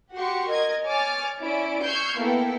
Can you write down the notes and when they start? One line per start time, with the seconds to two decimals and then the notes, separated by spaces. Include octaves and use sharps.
0.14 F#4 G4 F#5 C6 C#6
0.47 A#4 D#5 G#6
0.84 C#5 G#5 D6 F6 A6
1.41 C#4 E4 D5 D7
1.85 C#6 E6 F6 G6 G#6 C7
2.19 A#3 B3 E4 A4 G5